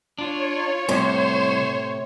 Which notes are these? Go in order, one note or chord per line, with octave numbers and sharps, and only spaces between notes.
D4 F4 C#5
C2 A2 C3 C5